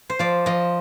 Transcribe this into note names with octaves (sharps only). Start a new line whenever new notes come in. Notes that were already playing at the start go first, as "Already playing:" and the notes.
C5
F3 D5
F3 D#5